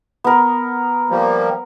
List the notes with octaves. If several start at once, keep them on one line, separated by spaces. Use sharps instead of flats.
B3 A#4
F3 G3 A#3